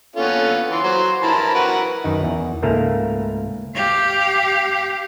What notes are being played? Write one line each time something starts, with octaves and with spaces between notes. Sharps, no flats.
D3 A#3 B3 C#4 F4 A4
E3 C6
F#3 C5
G2 F3 E4 A#4 A5 B5
F#4 A#4 B4
F#2 D#3 D#4
E2
C#2 G#2 A3 A#3 A#4 F5
G4 F5